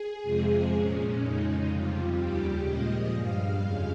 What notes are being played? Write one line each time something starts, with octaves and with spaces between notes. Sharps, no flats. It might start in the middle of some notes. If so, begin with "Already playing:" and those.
Already playing: G#4
F2 C3 F3 G#3
A#2 G#3 C#4
F2 C#3 G#3 D#4
F2 C3 G3 F4
D#2 C#3 G3 G4
A#2 F3 G#3 D#5
G2 G3 F5
F2 C#3 G#3 F5